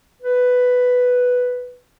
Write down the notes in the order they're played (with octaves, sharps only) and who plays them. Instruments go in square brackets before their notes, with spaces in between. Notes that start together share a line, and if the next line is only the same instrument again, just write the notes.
[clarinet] B4